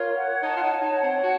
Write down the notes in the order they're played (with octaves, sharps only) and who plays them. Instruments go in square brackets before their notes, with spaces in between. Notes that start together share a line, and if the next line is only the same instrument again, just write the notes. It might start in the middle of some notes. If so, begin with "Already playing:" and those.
Already playing: [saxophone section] F4 [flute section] A#4 C#5
[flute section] F#5
[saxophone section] D#4 [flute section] A5
[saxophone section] F4
D#4
[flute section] C#5
[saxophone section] D#4
[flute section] F#5
[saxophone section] C4
[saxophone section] F#4 [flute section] A5